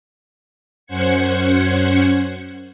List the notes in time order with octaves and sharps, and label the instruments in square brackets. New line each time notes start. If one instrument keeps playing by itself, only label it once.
[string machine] F#2 C#4 C5 F#5 G#6 C#7